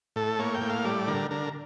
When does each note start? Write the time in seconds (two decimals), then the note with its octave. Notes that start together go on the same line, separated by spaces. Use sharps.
0.16 A2 A4
0.39 A#3 C#5
0.54 G5
0.61 A2
0.69 F5
0.85 G3 D5
1.07 D3 A#4
1.31 D3 A#4